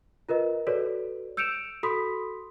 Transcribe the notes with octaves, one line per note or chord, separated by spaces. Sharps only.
F4 A#4 B4 D#5
F#4 A4 B4 C#5 D5
E6 G6 C#7 D7 E7 F7
F#4 A4 B5 C6 D#6 B6